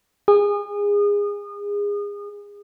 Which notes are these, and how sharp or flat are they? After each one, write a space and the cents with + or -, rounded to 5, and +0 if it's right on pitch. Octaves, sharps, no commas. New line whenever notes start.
G#4 -25 D#6 -30